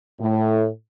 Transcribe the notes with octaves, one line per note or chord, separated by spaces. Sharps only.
A2